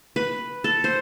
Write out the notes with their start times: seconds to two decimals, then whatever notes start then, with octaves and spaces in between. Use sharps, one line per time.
0.16 B4
0.64 A4
0.84 C5